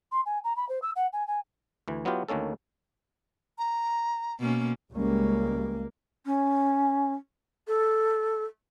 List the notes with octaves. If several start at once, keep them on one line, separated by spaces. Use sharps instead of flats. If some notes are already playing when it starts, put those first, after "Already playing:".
C6
G#5
A#5
B5
C5
E6
F#5
G#5
G#5
D2 E3
F#3 B3 E4 F4 G4
D2 D#3 A#3 C#4 A4
A#5
B2 A#3 C#4
C#2 G3 G#3 A#3 C#4
C#4
A4